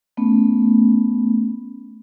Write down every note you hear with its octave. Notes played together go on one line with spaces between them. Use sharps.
A3 B3 C#4